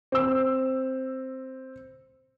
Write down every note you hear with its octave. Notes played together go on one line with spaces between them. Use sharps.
C4 E6